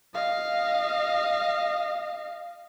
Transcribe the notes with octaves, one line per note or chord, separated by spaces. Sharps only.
D#5 F5